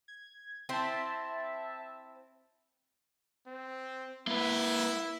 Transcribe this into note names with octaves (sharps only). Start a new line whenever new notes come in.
G#6
C4 E4 C5 E5 A5
C4
A#3 E4 B4